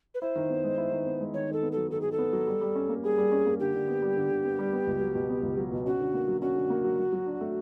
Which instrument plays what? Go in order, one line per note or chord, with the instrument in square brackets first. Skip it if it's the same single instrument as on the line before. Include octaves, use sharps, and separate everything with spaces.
[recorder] B4
[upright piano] E4 [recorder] C5
[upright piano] D#3
B3
G#3
E4
D#3
B3
G#3
[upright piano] D#3 [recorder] C#5
[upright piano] D#3 [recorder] A4
[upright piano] B3
[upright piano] F#3 [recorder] A4
[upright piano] D#3 [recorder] A4
[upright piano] D#3 [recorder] G#4
[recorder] A4
[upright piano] B3
F#3
G3
G3
C#4
A#3
[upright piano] G3 [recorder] G#4
[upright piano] G3
C#4
A#3
[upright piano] D3 [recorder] G4
[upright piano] D3
B3
G3
D3
D3
B3
G3
B3
C#2
F#3
B2
B3
C#2
F#3
B2
[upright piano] C#4 [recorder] F#4
[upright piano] D3
A#3
F#3
[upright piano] C#4 [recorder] F#4
[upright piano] D3
A#3
F#3
F#3
F#3
D4
A3